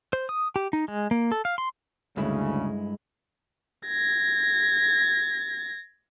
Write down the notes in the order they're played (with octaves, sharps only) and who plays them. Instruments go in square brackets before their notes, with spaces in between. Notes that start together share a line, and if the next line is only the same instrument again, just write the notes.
[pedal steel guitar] C5
D#6
G4
D#4
G#3
A#3
A4
F5
C6
[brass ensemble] D2 C#3 [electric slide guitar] G2 G#3 E4
[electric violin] G#6 A#6